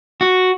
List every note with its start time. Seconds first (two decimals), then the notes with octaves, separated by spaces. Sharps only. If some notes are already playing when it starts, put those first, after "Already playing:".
0.21 F#4